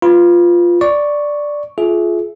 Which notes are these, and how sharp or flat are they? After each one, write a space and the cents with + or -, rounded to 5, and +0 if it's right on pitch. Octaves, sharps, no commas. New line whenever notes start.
F4 +0 B4 +15 B5 -35
D5 +0 C#6 +0
F4 +0 G#4 +30 E5 +0